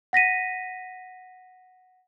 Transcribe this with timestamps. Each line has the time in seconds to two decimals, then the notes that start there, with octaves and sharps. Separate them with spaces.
0.13 F#5 A#6 B6 D#7